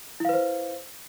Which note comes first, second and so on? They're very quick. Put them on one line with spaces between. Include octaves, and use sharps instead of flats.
E4 F5 B4 C5